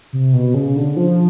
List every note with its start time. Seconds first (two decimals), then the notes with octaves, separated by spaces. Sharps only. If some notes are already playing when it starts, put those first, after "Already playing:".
0.13 C3
0.33 B2
0.54 C#3
0.76 D3
0.97 F3